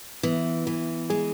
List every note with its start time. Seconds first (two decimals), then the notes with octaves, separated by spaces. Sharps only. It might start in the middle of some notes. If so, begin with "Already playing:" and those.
0.23 E3 B3
0.67 E3
1.10 G#3 G#4